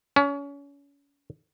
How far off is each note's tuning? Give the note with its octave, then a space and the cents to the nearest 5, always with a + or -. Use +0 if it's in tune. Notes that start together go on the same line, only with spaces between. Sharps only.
C#4 +30